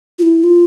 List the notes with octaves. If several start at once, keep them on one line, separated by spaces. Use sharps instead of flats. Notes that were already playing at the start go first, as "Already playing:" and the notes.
F4
E4
F4